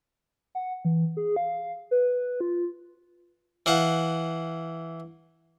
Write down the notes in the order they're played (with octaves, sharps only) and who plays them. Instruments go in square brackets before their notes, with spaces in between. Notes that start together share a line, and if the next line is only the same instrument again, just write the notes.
[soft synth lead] F#5
E3
G#4
F5
B4
F4
[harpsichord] E3 F5 F#5